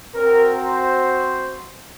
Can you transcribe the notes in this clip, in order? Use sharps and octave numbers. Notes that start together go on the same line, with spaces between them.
C4 F#4 A#4
C5